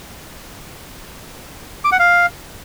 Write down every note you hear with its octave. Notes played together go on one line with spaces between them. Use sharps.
D6
F#5
F5